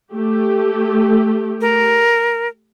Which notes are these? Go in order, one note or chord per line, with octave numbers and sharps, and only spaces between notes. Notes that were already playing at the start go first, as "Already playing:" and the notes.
A3 G4
A#4